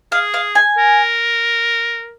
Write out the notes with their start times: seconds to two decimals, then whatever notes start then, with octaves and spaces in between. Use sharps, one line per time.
0.12 G#4 F5
0.34 F5
0.55 G#5
0.78 A#4